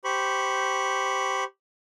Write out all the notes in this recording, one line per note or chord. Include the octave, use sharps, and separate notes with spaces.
G4 C5 B5 C#6